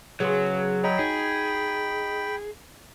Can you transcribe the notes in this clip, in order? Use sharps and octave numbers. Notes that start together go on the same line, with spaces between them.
C#3 F#3 B3 G#4 C#5 C6
C#5 D#5 G5 A#5 B5
D#4 F#4 G#4